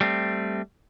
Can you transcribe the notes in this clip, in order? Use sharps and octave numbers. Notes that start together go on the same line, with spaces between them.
G3 A3 C4